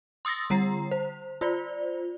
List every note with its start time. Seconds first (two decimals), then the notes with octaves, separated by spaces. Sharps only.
0.25 C6 D#6 E6 A6 A#6
0.50 D3 G3 A#5 C7
0.91 C5
1.41 F4 C5 D5